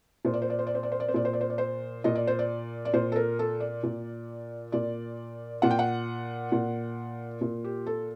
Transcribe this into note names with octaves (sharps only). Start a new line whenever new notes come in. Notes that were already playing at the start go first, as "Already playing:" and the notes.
A#2 C5
D5
C5
D5
C5
D5
C5
D5
C5
D5
C5
A#2 D5
C5
D5
C5
D5
C5
A#2 D#5
D5
C5
D5
D5
A#2 C5
A4
A#4
A4
D5
A#2
A#2 D5
A#2 F#5
G5
F#5
A#2
A#2
G4
A4